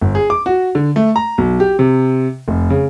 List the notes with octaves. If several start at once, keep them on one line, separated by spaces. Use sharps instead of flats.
G1
G#4
D6
F#4
D3
A3
A#5
B1
G4
C3
F1
C#3